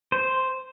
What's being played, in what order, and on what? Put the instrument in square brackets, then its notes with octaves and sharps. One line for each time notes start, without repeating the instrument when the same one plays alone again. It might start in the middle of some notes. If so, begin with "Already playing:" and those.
[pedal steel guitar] C5